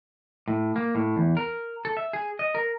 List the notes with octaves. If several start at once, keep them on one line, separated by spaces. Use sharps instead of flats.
A2
A#3
A2
E2
A#4
A4
E5
G#4
D#5
A#4